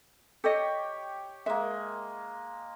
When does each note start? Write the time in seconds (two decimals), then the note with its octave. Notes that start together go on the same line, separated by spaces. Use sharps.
0.44 G4 A4 C#5 D#5
1.46 G#3 A#3 E5